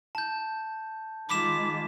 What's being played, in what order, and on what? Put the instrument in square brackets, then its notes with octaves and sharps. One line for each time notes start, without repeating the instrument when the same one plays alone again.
[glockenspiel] A5 G6
[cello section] D#3 G#3 F4 [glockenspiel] B5 B6 E7 [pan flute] D6